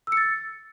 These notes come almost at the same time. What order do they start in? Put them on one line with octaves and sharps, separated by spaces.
E6 C#7 A6